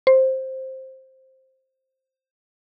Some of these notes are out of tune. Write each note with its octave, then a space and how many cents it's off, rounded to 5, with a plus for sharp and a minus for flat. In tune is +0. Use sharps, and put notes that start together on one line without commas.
C5 +10